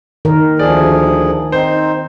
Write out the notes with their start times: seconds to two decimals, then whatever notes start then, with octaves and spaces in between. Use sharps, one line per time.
0.25 D#3 A#4
0.59 D2 F3 G#4 D5
1.52 C4 D#4 C5